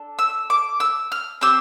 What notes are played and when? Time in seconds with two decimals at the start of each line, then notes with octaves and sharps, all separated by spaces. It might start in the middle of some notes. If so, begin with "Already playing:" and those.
Already playing: D4 A4
0.19 E6
0.50 D6
0.80 E6
1.12 F6
1.41 C4 G4 E6